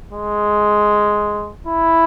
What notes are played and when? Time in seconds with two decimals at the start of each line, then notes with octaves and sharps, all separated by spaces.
0.13 G#3
1.67 E4